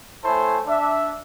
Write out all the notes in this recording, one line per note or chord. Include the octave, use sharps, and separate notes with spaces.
A3 E4 A4 C5 C#5 G#5
D4 E5